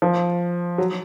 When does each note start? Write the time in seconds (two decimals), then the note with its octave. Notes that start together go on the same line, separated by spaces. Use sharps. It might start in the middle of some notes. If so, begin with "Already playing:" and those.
0.02 F3
0.78 F#3